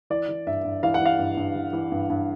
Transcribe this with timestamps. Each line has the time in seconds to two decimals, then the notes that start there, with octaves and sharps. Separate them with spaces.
0.10 E3 D5
0.28 E3
0.47 G2 E5
0.65 G2
0.83 E3 F5
0.94 F#5
1.01 E3 F5
1.19 G2
1.37 G2
1.55 E3
1.73 E3
1.92 G2
2.10 G2